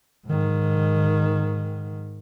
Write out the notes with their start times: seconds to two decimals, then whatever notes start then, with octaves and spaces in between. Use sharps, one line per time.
0.26 G#2 D#3